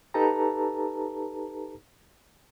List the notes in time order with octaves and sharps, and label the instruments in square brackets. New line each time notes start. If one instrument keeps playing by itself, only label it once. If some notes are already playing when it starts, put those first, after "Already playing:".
[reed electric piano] D#4 G4 A4 B4 A5 A#5